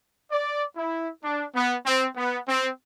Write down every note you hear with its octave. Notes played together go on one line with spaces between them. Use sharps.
D5
E4
D4
B3
C4
B3
C4